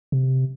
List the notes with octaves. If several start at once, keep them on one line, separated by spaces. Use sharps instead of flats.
C3